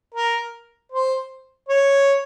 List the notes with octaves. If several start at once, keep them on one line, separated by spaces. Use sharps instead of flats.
A#4
C5
C#5